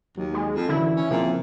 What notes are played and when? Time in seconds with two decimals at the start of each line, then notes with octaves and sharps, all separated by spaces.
0.18 D#2 F#3
0.34 G#3
0.54 F2
0.69 F#2 D3 E3 E4
0.96 C#4
1.11 A#2 C#3 F3 C4